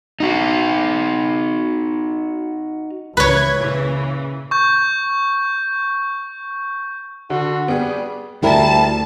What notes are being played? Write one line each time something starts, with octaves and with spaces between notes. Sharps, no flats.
D#4 F#4
C#2 E3 B4 C#5 G#6
A#2 C#3 E3
C#6 G6
D3 F#4
G3 B3 G4 G#4
D2 G3 E4 A#4 A5